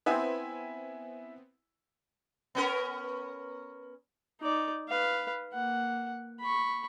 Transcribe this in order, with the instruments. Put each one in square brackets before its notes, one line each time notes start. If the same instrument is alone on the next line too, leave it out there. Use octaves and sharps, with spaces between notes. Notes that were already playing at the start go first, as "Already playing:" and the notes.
[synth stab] B3 C4 [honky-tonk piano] E4 E5 G#5
[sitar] B3 C#4 A#4
[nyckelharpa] D#4 D5
B4 F5
A#3 F#5
B5 C#6